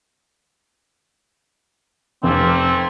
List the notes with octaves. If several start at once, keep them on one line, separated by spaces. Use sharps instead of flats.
F1 A3 A#3 C4